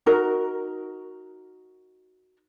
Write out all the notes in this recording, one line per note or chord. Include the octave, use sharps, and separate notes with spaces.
D#4 F#4 A#4